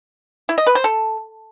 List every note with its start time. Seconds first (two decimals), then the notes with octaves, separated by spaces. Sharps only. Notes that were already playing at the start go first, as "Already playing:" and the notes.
0.49 E4
0.58 D#5
0.67 B4
0.75 C5
0.84 A4